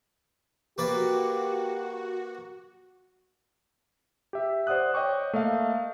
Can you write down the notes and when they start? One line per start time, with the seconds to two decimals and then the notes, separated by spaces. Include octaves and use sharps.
0.78 A#3 F#4 G4 B4 D5
4.33 G4 E5
4.67 C5 D5 F#5 D#6 F#6
4.94 C#5 D#5 G5 C#6 D6
5.33 A3 A#3 D#5 F5